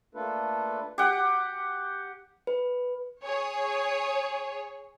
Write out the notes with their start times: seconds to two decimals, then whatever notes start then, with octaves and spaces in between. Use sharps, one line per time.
0.15 A3 A#3 D4 F4 A4 B4
0.98 G4 F#5
2.47 B4
3.23 G#4 C#5